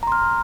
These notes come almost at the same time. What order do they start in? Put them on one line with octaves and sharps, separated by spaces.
A#5 C6 F6